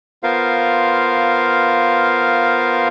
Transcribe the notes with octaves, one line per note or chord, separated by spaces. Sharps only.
B3 F4 A#4 C5 F5